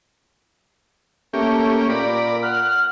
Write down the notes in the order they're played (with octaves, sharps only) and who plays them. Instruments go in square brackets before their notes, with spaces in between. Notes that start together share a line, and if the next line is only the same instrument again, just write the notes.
[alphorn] A3 [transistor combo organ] A#3 C#4 G4
[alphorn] A#2 [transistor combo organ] A#4 D5 B5
[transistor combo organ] F#5 [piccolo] F6